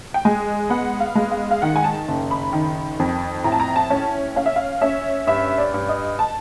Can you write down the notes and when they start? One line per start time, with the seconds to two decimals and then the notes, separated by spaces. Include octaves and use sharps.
0.14 G5
0.25 G#3 G#5
0.70 B3 F#5
1.00 F5
1.15 G#3
1.31 F5
1.51 F5
1.62 D#3 F#5
1.76 G#5
1.84 A5
2.08 F#1
2.31 B5
2.53 D#3
2.99 F2
3.44 A2 A#5
3.52 A5
3.60 A#5
3.76 A5
3.90 C#4
4.36 C#4 F5
4.46 E5
4.56 F5
4.81 C#4 E5
5.27 G2 E5
5.58 D5
5.74 G2
5.89 D#5
6.19 A5